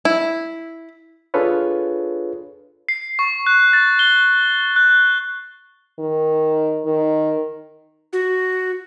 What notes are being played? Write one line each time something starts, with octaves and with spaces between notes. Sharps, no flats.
E4
D4 F4 G#4 A4 B4 C#5
C7
C#6
F#6
A6
G7
F#6
D#3
D#3
F#4